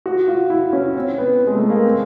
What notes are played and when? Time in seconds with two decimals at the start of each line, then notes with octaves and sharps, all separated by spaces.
0.06 F#4
0.28 F4
0.50 E4
0.73 C#4
0.96 C4
1.18 B3
1.47 G#3
1.55 A3
1.70 A#3
1.85 C4